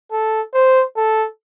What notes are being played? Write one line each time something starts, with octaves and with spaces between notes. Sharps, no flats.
A4
C5
A4